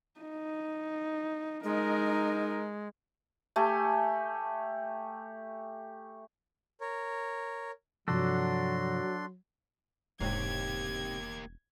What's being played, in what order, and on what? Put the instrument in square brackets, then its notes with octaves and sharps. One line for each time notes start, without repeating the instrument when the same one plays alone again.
[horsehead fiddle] D#4
[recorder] G#3 [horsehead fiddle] D#4 A#4
[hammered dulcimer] A3 G4 G#5
[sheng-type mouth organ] A#4 C#5
[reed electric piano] G2 C3 F3 [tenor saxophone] F#3 [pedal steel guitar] D4 F#4 A4 [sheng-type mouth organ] C6
[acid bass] E1 [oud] G#2 C3 C#5 [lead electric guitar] A#3 G4 [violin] G#6